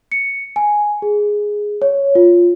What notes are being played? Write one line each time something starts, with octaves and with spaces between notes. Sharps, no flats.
C#7
G#5
G#4
C#5
F4